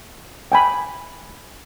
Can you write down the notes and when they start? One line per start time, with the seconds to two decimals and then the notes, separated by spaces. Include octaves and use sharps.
0.52 G5 G#5 B5